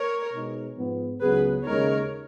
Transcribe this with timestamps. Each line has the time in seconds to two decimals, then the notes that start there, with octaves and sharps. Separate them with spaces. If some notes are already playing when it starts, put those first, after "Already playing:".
Already playing: A#4 C#5
0.32 B2 G#3 D#4
0.77 G#2 F3 B3
1.21 C#2 C#3 F#3 B3 G#4 B4
1.65 D#2 C#3 G#3 D#4 A#4 C#5